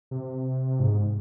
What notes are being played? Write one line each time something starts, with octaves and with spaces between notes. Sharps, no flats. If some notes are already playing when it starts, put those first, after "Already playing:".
C3
G#2